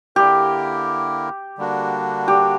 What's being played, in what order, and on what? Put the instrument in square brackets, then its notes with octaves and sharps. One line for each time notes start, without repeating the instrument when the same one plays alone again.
[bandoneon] D3 A#3 E4 A#4 [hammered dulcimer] G4
[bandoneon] D3 G3 A#3 D4 F#4
[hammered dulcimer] G4